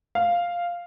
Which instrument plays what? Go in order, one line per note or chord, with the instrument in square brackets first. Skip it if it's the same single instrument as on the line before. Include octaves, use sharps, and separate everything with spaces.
[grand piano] F5